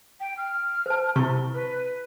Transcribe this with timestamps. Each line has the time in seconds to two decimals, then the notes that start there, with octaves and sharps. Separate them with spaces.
0.20 G5
0.37 F6
0.86 C5 A5
1.16 C3 E4 C#6
1.54 B4